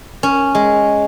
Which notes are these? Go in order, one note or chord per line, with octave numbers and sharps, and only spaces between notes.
C#4
G#3